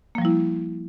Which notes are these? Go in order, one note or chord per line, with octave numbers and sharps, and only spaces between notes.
F3 G3 A#3 E4